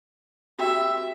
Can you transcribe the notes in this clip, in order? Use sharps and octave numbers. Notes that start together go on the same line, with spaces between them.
F#4 G4 E5 G5